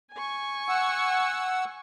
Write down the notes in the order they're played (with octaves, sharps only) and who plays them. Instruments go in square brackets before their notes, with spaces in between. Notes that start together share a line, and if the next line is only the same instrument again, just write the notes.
[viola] G#5 C#6
[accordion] F#5 E6